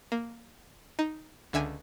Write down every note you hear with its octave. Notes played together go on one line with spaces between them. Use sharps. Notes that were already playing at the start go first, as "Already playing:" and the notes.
A#3
D#4
C#2 D3 E5 G#5